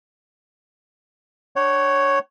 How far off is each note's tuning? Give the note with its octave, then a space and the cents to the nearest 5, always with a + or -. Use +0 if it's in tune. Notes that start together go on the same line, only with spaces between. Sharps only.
D4 +0 C#5 +0 F#5 +45